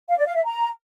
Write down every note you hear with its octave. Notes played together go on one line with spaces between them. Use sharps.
F5
D5
F5
E5
A#5